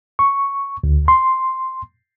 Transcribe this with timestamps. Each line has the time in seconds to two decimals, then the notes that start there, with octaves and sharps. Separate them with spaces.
0.19 C#6
0.84 D2
1.08 C6